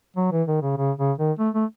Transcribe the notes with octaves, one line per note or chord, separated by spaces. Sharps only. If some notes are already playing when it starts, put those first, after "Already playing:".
F#3
E3
D#3
C#3
C#3
C#3
D#3
A3
A3